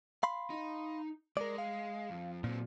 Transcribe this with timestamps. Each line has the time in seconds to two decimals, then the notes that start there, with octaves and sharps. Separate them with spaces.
0.23 F5 B5 C6
0.50 D#4
1.37 G#3 A#4 D5
1.58 F5
2.10 F2
2.44 A#2 F#3 C4